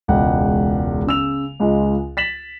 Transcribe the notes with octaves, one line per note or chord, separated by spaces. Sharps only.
E1 C#2 F#5 G5
C#3 E6 F7
C#2 G#3 F4
A6 B6 E7 F#7